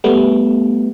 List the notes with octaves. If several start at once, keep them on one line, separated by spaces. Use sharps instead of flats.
G3 A3 B3